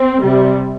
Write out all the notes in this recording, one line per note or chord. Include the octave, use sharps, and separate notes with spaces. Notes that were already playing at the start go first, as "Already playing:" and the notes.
Already playing: C4
C3 G3